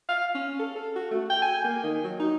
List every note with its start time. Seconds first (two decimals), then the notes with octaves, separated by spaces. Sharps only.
0.09 F5
0.35 C#4
0.59 A4
0.76 A4
0.96 F#4
1.11 A3
1.30 G5
1.42 G#5
1.64 A#3
1.83 D#3
2.04 F#3
2.19 D#4